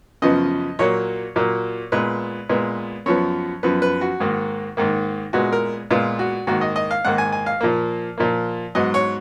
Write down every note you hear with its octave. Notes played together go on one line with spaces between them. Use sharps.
F#2 C#3 F3 B3 D#5
A#2 F#3 A#3 C#5
A#2 F#3 A#3
A#2 G#3 B3 B4
A#2 G#3 B3
F#2 F3 B3 C#5
F#2 F3 B3 B4
B4
F#4
G#2 D#3 A#3
G#2 D#3 A#3
A#2 G#3 B3 F#4
A#4
A#2 G#3 B3 F4
F#4
G#2 D#3 A#3 F#4
D#5
D#5
F5
G#2 D#3 A#3 F#5
G#5
G#5
F5
A#2 F3 A#3
A#2 F3 A#3
G#2 F#3 B3 D#5
C#5